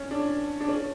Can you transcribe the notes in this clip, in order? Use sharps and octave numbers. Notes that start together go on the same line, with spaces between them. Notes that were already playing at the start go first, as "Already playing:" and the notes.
Already playing: C#4
D4
D4
C#4